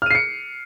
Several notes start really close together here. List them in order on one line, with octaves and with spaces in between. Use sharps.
F6 D#7 C7 C#7